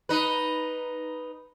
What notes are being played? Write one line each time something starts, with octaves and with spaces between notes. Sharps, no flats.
D#4 B4